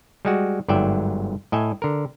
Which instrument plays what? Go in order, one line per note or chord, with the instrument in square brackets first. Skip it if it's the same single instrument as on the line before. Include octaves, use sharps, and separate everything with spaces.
[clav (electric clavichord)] G3 G#3 F#4
G1 G#2 F#3 D5 E5 G5
A2 D#5 E5 G#5
D3 A#4